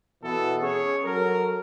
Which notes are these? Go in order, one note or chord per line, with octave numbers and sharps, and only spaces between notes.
B2 E3 B3 A4
C#4 G#4 C#5
F#3 A4 A#4